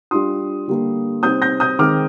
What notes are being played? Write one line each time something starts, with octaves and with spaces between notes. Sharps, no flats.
G3 D4 F4 C6 D#6
D3 G3 A#3
C3 G3 C4 D#4 D#6 G6
G6 A#6
D#6 G6
D#3 G#3 C4 D6 F6